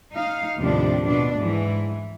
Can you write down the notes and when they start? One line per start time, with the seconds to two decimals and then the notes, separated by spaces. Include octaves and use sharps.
0.13 D#4 F5
0.59 D#2 A2 C3 F3 D4
1.07 B2 D4
1.40 G#2 E3